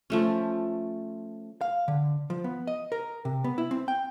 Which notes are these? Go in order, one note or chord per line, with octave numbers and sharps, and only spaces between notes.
F3 A3 C#4
F5
D3
F3
B3
D#5
A#4
C3
B3
E4
C4
G5